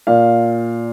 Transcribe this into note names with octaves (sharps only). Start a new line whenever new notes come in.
A#2 F5